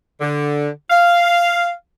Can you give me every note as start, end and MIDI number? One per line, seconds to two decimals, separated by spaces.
0.20 0.69 50
0.91 1.69 77